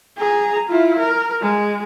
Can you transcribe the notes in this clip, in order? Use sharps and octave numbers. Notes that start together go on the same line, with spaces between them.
G#4 A#5
E4 F4
A#4
G#3